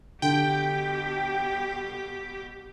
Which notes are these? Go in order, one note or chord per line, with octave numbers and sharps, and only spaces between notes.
B2 D3 G4 G5